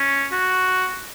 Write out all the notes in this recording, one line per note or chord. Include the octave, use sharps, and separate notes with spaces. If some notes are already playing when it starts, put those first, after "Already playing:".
Already playing: C#4
F#4